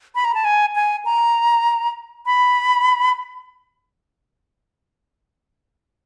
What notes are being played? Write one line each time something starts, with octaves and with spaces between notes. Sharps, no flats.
B5
A#5
A5
G#5
G#5
A#5
B5